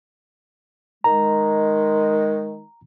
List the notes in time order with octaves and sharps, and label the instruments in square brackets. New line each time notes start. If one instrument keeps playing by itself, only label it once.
[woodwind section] D#3 G#3 [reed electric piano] A#5